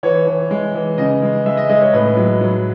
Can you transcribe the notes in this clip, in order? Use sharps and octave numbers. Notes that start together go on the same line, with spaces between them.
E3 C#5
E3
G#3
E3
C#3 D#5
G#3
G#3 E5
D#5
G#3 D#5
C#5
A2 B4
F#3
F#3